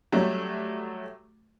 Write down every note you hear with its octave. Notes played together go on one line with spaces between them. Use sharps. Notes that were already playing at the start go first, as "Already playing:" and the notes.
F#3 G3 A3